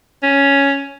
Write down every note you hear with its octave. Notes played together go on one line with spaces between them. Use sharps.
C#4